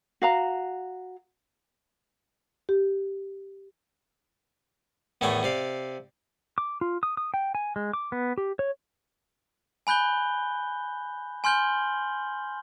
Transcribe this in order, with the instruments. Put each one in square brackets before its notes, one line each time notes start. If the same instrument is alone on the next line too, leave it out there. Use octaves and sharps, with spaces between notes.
[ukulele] F#4 F5 A#5
[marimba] G4
[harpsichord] E2 A2 D#3 A3 G#5 D6
C3 D5 F5
[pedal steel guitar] D6
F4
D#6
D#6
G5
G#5
G#3
D6
B3
G4
C#5
[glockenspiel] G#5 B5 F#6 G6 G7
G#5 C6 F6 G6 F#7 G7